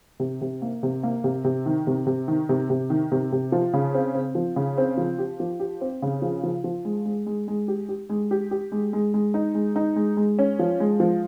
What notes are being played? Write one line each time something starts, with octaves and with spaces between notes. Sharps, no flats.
C3
C3
A#3
C3
A#3
C3
C3
D#3
C3
C3
D#3
C3
C3
D#3
C3
C3
F3
C#3
C4
C4
F3
C#3
C4
F3
G4
F3
G4
C4
C#3
F3
F3
F3
G#3
G#3
G#3
G#3
G4
G4
G#3
G4
G4
G#3
G#3
G#3
D#4
G#3
D#4
G#3
G#3
C#4
F3
G#3
F3